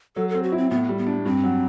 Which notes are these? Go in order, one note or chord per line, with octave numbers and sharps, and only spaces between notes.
F#3 A4
A4
C4
F#4
E4
C4
A2 B3
G3
B3
D4
G2 C4
F#3